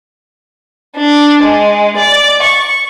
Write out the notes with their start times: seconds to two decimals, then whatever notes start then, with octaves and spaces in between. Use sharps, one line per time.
0.97 D4
1.43 G#3
1.97 D5
2.42 C#6